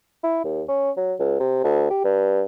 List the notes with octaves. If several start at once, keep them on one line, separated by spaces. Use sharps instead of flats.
E4
D#2
C#4
F#3
C#2
C3
D2
G4
G2